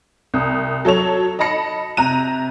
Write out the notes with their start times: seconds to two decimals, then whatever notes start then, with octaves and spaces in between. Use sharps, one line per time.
0.34 C2 D#6
0.85 F#3 A4 C#5 F7
1.39 D#5 A5 B5 A#6 C#7
1.97 C3 A#5 F#6 D#7